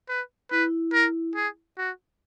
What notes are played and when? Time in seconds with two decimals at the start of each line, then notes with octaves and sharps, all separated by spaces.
0.08 B4
0.51 E4 B4
0.93 A#4
1.35 G#4
1.78 F#4